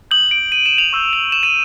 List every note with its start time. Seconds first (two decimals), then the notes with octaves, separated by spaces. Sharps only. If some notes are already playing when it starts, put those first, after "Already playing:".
0.11 D#6 G6 F#7
0.31 D7
0.52 D#7
0.66 E7
0.78 F7
0.93 C#6 E6 G6
1.13 F7
1.32 E7
1.43 D#7